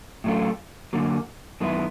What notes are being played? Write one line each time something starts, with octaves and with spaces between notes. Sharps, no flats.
A2 F#3 A3 C#4 F4
F#2 D3 F#3 A#3
F#2 D#3 G#3 B3 E4